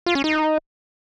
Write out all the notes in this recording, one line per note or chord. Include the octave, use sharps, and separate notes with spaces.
F4
C#4
D#4